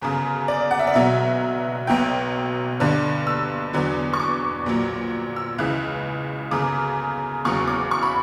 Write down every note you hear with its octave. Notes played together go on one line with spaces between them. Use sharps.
G1 F#2 C#3
D5
F#5
E5
D5
B1 B2 F#3 E5
B1 B2 F#3 G5
G1 G2 D3
E6
E2 D3 F#3
C#6
D6
A#1 A#2 F#3
E6
C#2 C#3 E3 F#6
G1 F#2 C#3 D6
F#1 E2 C#3 F#3 C#6
D6
C#6
B5